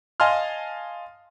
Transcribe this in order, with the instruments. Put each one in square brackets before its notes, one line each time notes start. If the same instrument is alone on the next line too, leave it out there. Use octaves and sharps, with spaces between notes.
[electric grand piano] D#5 F5 G#5 A5 C6 F6